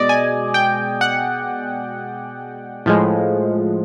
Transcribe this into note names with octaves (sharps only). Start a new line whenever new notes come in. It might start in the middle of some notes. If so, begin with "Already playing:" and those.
Already playing: B2 G#3 D5 D#5
G#5
G5
F#5
A2 F3 G#3